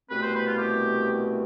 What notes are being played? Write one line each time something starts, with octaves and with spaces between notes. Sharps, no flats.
C2 B2 A3 C4 B4
C5
B4
F4
G4